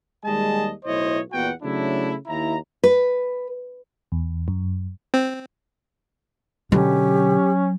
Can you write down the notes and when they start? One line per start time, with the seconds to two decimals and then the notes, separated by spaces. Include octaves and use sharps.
0.24 D#2 G3 G#3 G#4 D#5 A5
0.84 B1 A2 E4 C5 C#5 D#5
1.32 E2 A#2 B3 F#4 F#5 G5
1.63 C#3 F#3 A3 D4 E4
2.27 D#2 E4 A#5
2.84 B4
4.12 E2
4.48 F#2
5.14 C4
6.72 B2 D3 F#3 C#4 G4